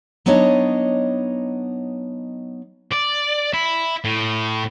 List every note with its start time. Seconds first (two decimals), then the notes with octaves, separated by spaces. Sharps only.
0.26 F#3 B3 D4 D#4 C#5 D#5
2.92 D5
3.54 E4
4.05 A2